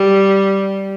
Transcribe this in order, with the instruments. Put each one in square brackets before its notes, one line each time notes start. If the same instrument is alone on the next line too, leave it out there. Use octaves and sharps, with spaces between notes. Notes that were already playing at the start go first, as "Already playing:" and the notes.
Already playing: [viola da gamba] G3